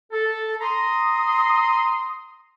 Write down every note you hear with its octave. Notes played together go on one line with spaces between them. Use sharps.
A4
A#5 C6 D#6